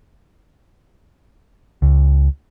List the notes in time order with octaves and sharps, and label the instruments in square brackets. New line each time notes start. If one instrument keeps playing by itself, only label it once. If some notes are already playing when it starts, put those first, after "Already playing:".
[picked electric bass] C#2